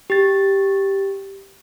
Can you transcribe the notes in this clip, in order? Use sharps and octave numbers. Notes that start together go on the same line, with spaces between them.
G4 A6